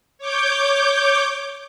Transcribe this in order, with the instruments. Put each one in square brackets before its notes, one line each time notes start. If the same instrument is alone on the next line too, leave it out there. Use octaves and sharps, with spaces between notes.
[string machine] C#5 D6 G6